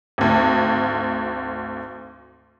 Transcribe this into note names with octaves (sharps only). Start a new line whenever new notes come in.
G#1 D2